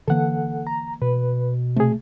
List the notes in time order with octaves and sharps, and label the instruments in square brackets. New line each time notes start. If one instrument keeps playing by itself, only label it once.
[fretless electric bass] D3 E3 A#3 [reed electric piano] A4 F#5
[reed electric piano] A#5
[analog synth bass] B2 [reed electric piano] B4
[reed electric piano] C3 G#4 [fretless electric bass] A3